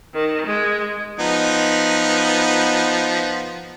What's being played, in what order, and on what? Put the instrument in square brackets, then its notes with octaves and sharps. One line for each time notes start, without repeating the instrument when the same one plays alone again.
[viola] D#3
G#3
[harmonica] F3 B3 D#4